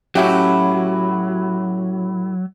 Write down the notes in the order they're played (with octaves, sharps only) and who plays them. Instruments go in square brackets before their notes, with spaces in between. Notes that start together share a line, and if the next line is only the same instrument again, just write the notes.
[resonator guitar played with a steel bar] A2 E4 G4 [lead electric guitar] F#3 [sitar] C#4 F#4